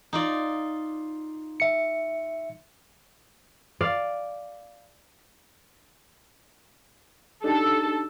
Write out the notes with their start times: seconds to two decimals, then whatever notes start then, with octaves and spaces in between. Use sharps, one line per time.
0.13 D#4 F4 D5
1.60 E5 C#7
3.81 D5 F5
7.44 D4 D#4 G4 A4